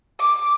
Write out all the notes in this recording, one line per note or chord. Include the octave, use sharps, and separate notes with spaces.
D6